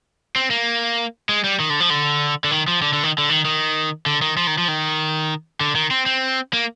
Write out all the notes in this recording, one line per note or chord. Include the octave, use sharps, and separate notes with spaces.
C4
A#3
G#3
G3
D#3
D3
F3
D3
D3
D#3
F3
D3
D3
D#3
D3
D#3
D#3
D3
D#3
F3
D#3
F3
D#3
D3
D#3
C4
C4
A#3